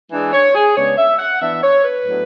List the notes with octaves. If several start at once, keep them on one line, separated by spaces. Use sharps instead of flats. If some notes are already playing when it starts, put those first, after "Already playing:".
E3 G#3 D4
C#5
G#4
C#3 G#3 B3 D4 C#5
E5
F#5
E3 B3 D4 E5
C#5
B4
A2 F#3 B3 D4